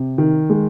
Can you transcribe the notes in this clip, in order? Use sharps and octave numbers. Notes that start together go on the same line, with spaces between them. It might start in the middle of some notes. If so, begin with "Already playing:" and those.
Already playing: C3
D#3
G#3